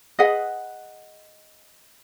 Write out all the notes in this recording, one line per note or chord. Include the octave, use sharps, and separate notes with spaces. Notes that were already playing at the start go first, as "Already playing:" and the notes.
G#4 B4 D#5 F#5